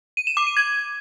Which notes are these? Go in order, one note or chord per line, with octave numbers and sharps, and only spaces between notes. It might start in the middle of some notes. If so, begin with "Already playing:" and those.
D#7
E7
D6
D#7
G#6